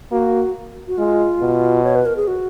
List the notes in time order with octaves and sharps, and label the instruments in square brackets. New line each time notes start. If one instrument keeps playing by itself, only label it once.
[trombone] A#3 [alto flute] F#4
[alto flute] F#4
[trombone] G#3 [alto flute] F4
[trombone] B2
[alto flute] C#5
B4
A#4
G#4
F#4